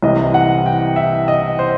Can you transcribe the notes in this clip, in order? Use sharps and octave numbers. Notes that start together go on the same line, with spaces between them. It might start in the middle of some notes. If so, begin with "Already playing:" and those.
C2 C3 E3 D#5
F#5
G5
E5
D#5
C5